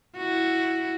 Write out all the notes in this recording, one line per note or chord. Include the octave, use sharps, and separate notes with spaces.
E4 F#4